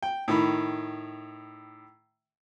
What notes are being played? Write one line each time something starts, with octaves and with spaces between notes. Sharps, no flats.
G5
A2 D#3 B5